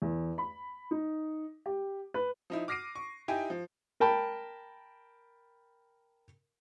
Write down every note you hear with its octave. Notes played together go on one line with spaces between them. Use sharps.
E2
B5
D#4
G4
B4
F3 D#4 E4
D6 F6 A#6 C7 D7 D#7
C#6
D#4 E4 G4 G5 G#5
F3
A#4 G5 A5 B5